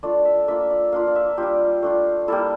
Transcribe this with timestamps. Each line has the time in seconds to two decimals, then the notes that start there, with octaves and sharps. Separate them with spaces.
0.03 A3 D4 F4 D5
0.25 E5
0.48 A#3 D4 F4 E5
0.70 D5
0.92 A#3 D4 F4 F5
1.07 D5
1.16 E5
1.38 G3 D4 F4 G4
1.83 A3 D4 F4
2.28 G3 A#3 E4 A4